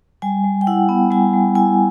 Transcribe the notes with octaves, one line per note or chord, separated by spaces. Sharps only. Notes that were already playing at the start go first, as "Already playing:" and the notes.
G3 G#5
G3
G5
E4 F#5
B3
G3 G#5
G3
E4 G#5